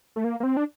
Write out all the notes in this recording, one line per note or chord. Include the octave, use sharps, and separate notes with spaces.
A3
A#3
A#3
C4
D4